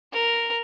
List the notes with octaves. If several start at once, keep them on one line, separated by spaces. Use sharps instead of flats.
A#4